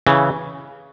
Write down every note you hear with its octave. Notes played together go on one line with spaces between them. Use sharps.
C#3 E3